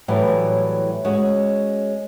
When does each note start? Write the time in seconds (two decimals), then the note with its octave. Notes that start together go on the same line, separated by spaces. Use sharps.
0.08 A2 E3 F#3 G3
1.05 G#3 C#4 F#4